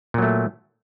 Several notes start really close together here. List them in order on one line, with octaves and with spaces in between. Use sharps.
A#2 F#3 A3